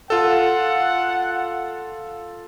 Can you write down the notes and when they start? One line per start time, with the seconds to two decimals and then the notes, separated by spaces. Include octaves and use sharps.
0.10 F4 A4 F#5